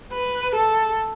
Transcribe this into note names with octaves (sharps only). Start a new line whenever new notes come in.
B4
A4